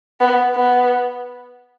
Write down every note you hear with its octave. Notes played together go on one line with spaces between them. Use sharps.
B3
B3